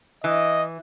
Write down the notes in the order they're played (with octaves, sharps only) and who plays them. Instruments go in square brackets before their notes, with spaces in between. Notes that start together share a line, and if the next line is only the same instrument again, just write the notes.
[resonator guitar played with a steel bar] E3 [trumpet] D#5